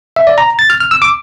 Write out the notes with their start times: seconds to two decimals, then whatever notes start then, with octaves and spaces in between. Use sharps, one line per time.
0.16 E5
0.27 D5
0.38 A#5
0.59 A6
0.70 F6
0.80 F6
0.91 E6
1.02 D6